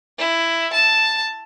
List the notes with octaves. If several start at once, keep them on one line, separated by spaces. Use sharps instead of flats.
E4
A5